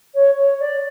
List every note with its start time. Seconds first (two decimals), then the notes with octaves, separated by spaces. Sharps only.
0.14 C#5
0.38 C#5
0.60 D5